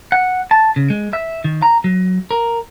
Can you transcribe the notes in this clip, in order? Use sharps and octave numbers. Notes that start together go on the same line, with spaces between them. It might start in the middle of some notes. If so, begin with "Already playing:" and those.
F#5
A5
C#3
G#3
E5
D#3
A#5
F#3
A#4